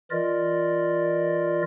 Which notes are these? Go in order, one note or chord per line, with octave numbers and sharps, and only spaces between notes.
E3 F4 A#4 D5 D#5